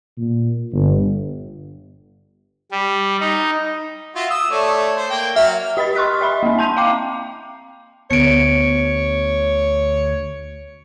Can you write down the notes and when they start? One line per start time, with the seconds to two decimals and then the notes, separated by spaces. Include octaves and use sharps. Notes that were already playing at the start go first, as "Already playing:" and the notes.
0.18 A#2
0.73 G1
2.72 G3
3.20 D#4
4.16 F4 F#4 E5
4.30 D#6 E6
4.51 A3 C#5 D5
4.97 C5
5.10 A#3 G5
5.36 F#3 E5 F6
5.77 G4 D#5 B5 A6
5.95 C6 C#6 F6 F#6 B6
6.21 D#5 E5 B5
6.43 A#3 C4
6.59 A5 C6 G6 D#7 F7
6.77 F5 G5 A#5 D6 C7
8.11 D2 B3 C#5 C#7 D7